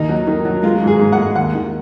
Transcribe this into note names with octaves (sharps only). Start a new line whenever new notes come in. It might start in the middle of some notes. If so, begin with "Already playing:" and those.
Already playing: D#2 D#4
F#3
D#3
F#3
G#3 F4
G#2
G#4
G#2
F#5
G#3
D#2 F#5
D#3